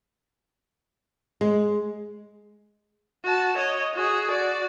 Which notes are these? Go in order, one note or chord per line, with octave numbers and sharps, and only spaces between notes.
G#3
F#4 A5
C#5 D#5
F#4 G#4
F#4 D5